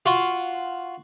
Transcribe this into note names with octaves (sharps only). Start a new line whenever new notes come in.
F4 F#4